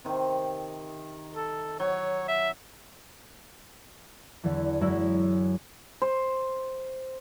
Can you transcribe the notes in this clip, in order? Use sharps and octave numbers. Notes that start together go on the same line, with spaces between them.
C3 D#3
A4
F#3 C#5
E5
E2 D3 E3
F#2 G#3 E4 E6
C5